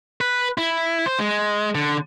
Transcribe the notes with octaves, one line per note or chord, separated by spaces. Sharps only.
B4
E4
C5
G#3
D3